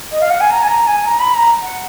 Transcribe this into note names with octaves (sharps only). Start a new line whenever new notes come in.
D#5
F5
F#5
G#5
A#5
G#5
A#5
G#5
A#5
B5
A#5
F#5